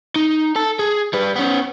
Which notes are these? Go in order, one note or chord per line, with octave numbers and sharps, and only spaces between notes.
D#4
A4 A5
G#4
G3 B4
B3 C#4